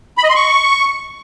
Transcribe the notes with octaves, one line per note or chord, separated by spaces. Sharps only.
B5
D#5
C6
C#6